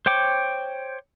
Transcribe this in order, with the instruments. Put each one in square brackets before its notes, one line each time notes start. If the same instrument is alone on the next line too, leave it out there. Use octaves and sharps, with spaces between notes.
[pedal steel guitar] C5 C#5 G5 D6